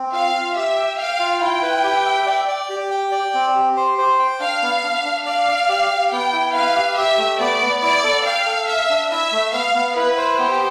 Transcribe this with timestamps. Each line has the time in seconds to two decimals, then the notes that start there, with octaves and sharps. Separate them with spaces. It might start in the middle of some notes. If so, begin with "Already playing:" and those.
Already playing: C4
0.13 F4 F5
0.34 F4
0.55 G4 E5
0.77 G5
0.98 F5 G5
1.20 F4
1.41 E4 G5
1.62 B4
1.84 G4
2.05 E5
2.26 D5
2.48 D5
2.69 G4
2.91 G5
3.12 D5
3.34 C4
3.56 G4
3.77 C5
3.98 C5
4.19 G5
4.40 D4 F5
4.62 B3
4.83 D4
5.05 D4
5.26 D5 F5
5.48 D5
5.69 G4
5.90 G4
6.12 B3 G5
6.33 E4
6.54 B4 F5
6.76 G4
6.97 G4 E5
7.18 A3
7.40 B3 D5
7.61 B3
7.82 E4 D5
8.04 A4
8.25 F5 G5
8.46 A4
8.67 E5 F5
8.90 D4
9.11 E4 E5
9.32 A3
9.53 B3 F5
9.75 B3
9.96 E4 B4
10.17 C5
10.39 B3 G4